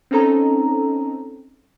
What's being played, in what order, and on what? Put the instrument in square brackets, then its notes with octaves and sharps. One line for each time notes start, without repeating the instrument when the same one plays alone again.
[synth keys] C4 C#4 D#4 A4 A#5